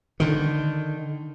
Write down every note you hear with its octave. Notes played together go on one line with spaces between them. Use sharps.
D3 D#3